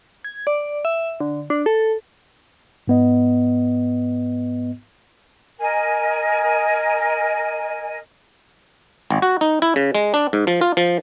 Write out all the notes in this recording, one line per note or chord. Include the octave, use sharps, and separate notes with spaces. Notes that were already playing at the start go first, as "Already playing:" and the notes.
G#6
D5
E5
D3
D4
A4
G#2 B3 D#5
A#4 D#5 G#5
G#1
F#4
D#4
E4
C#3
G#3
D4
G#2
F3
F4
F3